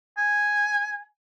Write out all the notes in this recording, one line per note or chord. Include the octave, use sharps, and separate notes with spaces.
G#5